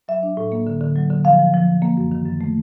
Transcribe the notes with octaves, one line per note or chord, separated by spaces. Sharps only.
F#3 E5
D4
A2
A#3
D3
D3
F#3
D3
F3 F5
F3
F3
F3
A#3
F#2
D#3
F#2
A3